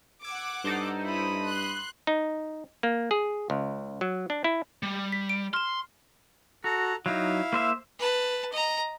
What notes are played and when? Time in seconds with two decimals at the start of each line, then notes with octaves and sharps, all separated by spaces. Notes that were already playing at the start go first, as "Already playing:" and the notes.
0.24 F#5 D6 E6 G#6 D7
0.65 G2 D#4 A4 C5
1.06 E4 B5 D#6
1.48 C6 F#6
2.07 D#4
2.83 A#3
3.11 G#4
3.50 C#2
4.01 F#3
4.30 D4
4.44 E4
4.83 G3
5.12 B6
5.29 D7
5.53 C6 F6 E7
6.64 F#4 A4 A#5
7.06 F#3 D#4 E4 F5
7.53 A#3 C5 E5
7.99 B4 A5
8.53 D#5 A#5